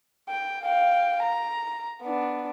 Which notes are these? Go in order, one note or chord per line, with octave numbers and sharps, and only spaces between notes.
G5
F5 G5
A#5
B3 D4